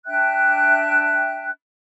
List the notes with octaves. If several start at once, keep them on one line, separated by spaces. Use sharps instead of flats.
D4 E5 G5 F#6